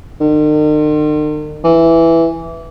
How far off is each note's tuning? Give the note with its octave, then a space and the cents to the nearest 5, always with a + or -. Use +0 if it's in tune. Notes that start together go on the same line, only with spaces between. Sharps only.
D#3 -45
E3 +5